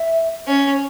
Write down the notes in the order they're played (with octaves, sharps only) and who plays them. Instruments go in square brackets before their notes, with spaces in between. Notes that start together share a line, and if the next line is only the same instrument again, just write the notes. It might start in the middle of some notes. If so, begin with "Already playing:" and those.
Already playing: [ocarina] E5
[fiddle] C#4 [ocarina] C#5